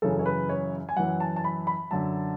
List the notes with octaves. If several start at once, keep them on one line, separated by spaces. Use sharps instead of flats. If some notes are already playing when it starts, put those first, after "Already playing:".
F#2 C#3 E3 A4
C#5
B4
C#5
G#5
F#2 E3 F#5
A5
A5
B5
B5
F#2 D3 A5